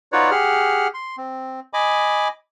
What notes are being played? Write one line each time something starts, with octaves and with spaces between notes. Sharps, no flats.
D#4 F4 F#4 B4 C#5 D5
G4 G#4 F#5 F6
C6
C4
D#5 G#5 B5 D6